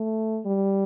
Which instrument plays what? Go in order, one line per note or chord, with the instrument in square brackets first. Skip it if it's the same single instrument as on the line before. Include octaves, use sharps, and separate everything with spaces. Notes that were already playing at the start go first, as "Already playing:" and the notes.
Already playing: [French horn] A3
G3